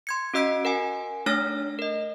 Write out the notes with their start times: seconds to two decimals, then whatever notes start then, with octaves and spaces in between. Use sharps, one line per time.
0.07 C6 G#6 C#7
0.34 C#4 F#4 D#5 E6 B6 D7
0.65 A#4 F#5 G#5
1.26 A3 D4 D#4 C#5 F6 A#6
1.79 A#4 D#5